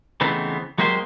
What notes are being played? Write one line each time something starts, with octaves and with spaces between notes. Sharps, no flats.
C#3 E3 A3 B3 C4 D#4
F#3 G#3 A#3 C4 G4 C5